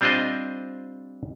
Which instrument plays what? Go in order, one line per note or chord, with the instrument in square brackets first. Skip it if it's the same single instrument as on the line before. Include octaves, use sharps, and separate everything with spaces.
[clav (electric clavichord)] G3 C4 D4 F4 C5 D#5